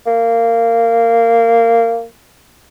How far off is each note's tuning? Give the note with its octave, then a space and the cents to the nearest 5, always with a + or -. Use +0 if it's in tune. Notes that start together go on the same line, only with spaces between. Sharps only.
A#3 -15